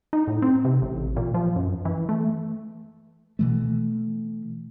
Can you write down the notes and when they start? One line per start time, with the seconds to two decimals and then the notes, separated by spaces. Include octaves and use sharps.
0.13 D#4
0.28 A2
0.42 C4
0.65 C3
0.82 A1
1.17 A#2
1.34 F3
1.56 F#2
1.85 E3
2.09 A3
3.39 B2 E3 A3